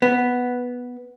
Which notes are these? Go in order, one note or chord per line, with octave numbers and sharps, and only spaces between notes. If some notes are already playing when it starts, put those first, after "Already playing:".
B3